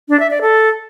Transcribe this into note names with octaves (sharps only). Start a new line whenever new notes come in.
D4
E5
D5
A4